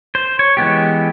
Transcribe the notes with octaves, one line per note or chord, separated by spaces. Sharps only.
C5
C#5
E3 G#3 B3 G4